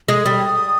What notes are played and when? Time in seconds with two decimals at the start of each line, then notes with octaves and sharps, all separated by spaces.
0.08 G#3 D#6
0.26 G3